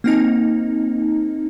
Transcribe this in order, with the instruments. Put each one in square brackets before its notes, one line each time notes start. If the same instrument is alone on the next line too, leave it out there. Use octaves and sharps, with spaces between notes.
[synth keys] A#3 C4 D#4